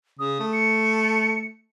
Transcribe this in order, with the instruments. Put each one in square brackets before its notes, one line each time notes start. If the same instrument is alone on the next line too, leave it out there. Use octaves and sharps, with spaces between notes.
[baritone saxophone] C#3 [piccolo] D#6
[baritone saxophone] A3
[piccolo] C#7